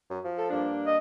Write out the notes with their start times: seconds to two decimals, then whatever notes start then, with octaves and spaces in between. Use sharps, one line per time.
0.10 F#2
0.24 F3
0.38 A4
0.50 G2 A#3 D4
0.87 D#5